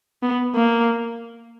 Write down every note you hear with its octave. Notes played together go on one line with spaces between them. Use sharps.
B3
A#3